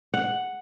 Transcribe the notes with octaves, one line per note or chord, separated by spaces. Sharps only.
F#5